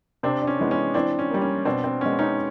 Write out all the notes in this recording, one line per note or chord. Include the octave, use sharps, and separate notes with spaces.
C3 C4 D4
D4
C#4
E3 G#3 B3
C#4
E3 C4 D4
C#4
G3 A#3
C#4
B2 C4 D4
C4
G#3 B3 C#4
C#4 D#4